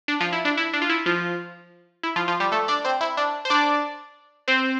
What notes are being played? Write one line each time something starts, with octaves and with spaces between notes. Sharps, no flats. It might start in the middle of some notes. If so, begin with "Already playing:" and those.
D4
F3 F4
E4
D4
E4
D4
F4
E4
F3 F4
E4
F3 F4
F3 F4
G3 G4
A3 A4
D4 D5
C4 C5
E4
D4
C5
D4 D5
C4 C5